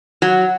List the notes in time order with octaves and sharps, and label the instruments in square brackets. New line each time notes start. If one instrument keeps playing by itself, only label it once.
[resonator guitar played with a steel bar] F#3